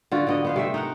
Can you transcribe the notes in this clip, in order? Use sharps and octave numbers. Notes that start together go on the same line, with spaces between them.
D3 F4 F#4
D3 B3 D#5
B3 C5 F5
C3 A3 E5
D#4 A#4 F#5